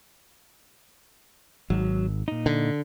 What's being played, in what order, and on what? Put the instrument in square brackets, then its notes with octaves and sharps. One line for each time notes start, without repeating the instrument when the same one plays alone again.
[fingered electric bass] G#1 [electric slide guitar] F#3
[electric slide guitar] A#2 D#4
[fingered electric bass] D3